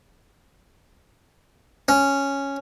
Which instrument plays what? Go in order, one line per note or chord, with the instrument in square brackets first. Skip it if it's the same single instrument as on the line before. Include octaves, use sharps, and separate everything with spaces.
[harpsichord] C#4